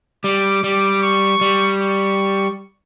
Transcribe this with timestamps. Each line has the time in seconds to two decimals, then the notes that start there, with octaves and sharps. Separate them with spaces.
0.24 G3 D6
0.64 G3 D6
1.03 C#6
1.41 G3
1.81 C#6